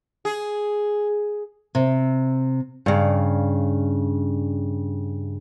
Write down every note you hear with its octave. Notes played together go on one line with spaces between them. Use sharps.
G#4
C3
G2 C#3